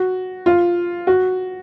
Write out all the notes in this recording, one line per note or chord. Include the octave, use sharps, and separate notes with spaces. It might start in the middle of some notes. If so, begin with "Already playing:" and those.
Already playing: F#4
F4
F#4